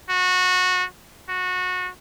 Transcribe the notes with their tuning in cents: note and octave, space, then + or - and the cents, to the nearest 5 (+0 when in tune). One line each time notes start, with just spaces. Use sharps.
F#4 -20
F#4 -20